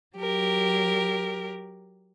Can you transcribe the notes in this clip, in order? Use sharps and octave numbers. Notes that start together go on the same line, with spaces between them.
F#3 G4 A#4